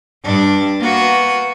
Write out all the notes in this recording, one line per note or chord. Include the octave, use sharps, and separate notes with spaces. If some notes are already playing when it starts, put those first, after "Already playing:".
G2 D4
A#3 B3 F#4